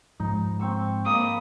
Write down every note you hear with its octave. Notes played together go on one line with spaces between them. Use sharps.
G#2 F3 D#4
C4 C#6 E6
A#3 D5 B5 D#6